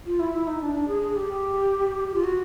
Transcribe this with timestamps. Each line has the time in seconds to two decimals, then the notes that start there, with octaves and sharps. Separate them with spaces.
0.06 F4
0.20 E4
0.34 E4
0.47 D#4
0.61 D4
0.75 D4
0.88 G#4
1.02 G#4
1.16 G4
2.14 F4
2.24 F#4